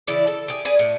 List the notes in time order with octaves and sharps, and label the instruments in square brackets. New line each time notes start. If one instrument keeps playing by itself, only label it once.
[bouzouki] C#3 E3 E4 D5
A4
G4 G#4
G#4 B4 D5
A2